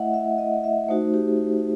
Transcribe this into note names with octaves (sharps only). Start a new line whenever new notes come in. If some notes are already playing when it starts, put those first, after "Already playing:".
Already playing: A3 E4 D#5 E5 F#5
E5
D#5
E5
A3 D#4 F#4 C5
G4